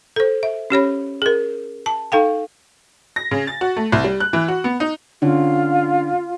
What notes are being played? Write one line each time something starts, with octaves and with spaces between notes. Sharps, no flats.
A4 C5
E5
C#4 G4 C#5 B5
G#4 A#4
A5
D#4 A4 F5 G5
A#6
C#3
A6
F#4
A3
C2
G3
F#6
E3
F#4
B3
D#4
D3 C#4 F4